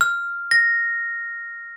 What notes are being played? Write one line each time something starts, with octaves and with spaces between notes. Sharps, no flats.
F6
A#6